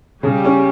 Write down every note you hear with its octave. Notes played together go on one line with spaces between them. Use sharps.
C#3 G3
C#4